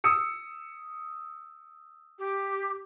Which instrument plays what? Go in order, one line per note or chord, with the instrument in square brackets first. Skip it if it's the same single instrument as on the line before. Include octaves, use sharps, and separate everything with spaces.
[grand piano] D#6 E6 C#7
[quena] G4